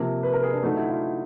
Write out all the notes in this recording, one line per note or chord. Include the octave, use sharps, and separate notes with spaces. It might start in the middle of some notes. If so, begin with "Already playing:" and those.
Already playing: C3 F3 A#3
B4
A#4
G#4
D4
D3 F#3 A3 D#4
E4
F4